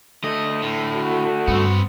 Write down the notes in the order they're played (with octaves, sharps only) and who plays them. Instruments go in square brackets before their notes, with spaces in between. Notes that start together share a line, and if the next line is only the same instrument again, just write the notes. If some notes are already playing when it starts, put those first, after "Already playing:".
[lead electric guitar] D3 A3 [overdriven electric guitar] D#5
[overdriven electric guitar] A2
[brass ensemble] F#4
[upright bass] G2 [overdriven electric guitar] B3 C4